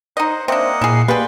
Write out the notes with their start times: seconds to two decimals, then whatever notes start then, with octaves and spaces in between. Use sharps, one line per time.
0.17 D#4 C5 D#5 F#5
0.48 A#3 C4 D4 C5 D#5 E5 F#5
0.81 A#2 E4 G#4 C7
1.08 A#3 G4 G#4 B4 D5 F5 G5 C6